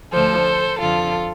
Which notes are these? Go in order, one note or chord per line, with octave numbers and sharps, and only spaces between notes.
D2 D3 F3 A4 C5
F2 D3 F3 F4 A4